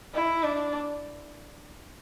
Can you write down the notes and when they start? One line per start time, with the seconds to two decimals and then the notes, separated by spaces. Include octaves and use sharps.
0.14 E4
0.44 D4